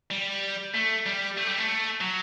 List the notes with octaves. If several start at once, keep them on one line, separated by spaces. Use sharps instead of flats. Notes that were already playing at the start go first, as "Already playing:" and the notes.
G3
A3
G3
A3
G3
A3
F#3